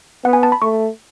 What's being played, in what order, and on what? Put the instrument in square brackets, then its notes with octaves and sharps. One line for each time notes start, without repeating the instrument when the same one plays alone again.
[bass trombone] B3 [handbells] F#5
[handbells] G#5
A5
B5
[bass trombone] A3 [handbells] C#6